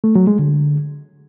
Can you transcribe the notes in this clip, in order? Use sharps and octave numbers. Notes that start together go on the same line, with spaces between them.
A3
F#3
G#3
D3